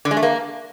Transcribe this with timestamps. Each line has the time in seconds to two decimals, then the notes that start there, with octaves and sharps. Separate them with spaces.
0.05 D3
0.11 G#3
0.17 A3
0.23 A#3